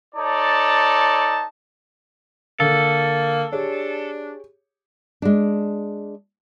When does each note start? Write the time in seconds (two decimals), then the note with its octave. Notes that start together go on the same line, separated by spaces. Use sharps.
0.15 D#4 A4 C#5 D5 A5
2.60 D3 A#3 A4
3.53 D4 G4 G#4 C#5
5.22 G#3 D4